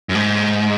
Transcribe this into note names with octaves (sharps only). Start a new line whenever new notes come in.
F#2
G#2